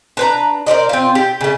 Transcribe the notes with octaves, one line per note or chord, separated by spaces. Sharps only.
D4 B4 A#5
A#4 C5 D5 D#5
C4 F4
G4
C#3 A3